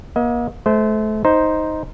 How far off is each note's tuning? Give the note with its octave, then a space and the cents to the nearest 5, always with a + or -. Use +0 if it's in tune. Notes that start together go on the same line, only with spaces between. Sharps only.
A#3 +40 D#5 +35
A3 -30 C5 -15
D#4 +5 C5 +0